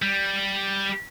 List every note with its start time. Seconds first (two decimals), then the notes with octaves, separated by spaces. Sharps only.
0.02 G3